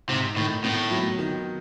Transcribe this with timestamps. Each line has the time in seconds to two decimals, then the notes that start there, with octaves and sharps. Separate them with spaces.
0.08 G#2 C3
0.36 A2 D#3
0.64 A2 B3
0.91 F#3
1.19 D#3